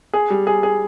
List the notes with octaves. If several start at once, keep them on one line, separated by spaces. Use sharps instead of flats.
G#4
G3
G#4
G#4